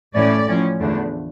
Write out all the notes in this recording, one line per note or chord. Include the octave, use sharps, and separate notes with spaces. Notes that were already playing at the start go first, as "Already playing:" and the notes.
A2 E3 A3 C#4 D5
A2 F3 C#4
E2 D3 F3 A3 D4